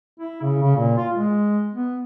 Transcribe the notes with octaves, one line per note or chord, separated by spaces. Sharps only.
E4
C#3
C#3
A#2
F4
G#3
B3